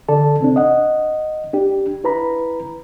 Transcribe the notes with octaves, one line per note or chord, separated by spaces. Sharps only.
D3 A4 D5 A5
C3 C4 D4
D#5 F#5
D4 G4
E4 B4 A#5 B5